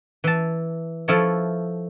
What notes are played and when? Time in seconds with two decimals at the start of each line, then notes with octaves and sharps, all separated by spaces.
0.24 E3 A5
1.08 F3 E4 A4 C#5